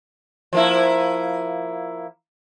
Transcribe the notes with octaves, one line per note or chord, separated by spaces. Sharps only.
F3 A#3 E4